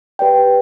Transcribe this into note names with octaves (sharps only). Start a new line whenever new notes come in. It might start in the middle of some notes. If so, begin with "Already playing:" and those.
G4 B4 D5 G5